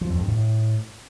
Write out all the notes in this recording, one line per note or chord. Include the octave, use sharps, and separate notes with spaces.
F3
F2
G2
A2